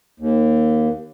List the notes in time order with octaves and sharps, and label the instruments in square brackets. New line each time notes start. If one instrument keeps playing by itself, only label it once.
[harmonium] D#2